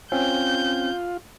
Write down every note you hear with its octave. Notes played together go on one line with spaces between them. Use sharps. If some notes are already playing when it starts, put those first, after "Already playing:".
C4 C#4 F4 G6